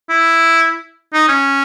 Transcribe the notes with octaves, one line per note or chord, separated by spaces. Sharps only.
E4
D#4
C#4